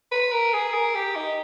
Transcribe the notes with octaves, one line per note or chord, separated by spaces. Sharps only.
B4
A#4
G#4
A#4
G4
D#4